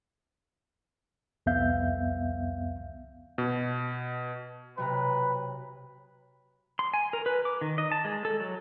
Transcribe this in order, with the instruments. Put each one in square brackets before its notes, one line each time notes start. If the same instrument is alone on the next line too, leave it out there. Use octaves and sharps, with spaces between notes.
[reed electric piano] C2 F2 B3 E5 F5 G6
[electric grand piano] B2
[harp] B1 C3 A#5 [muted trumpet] B4
[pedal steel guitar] C6
G#5
A#4
B4
D6
D#3
D#5
A5
G#3
A4
F#3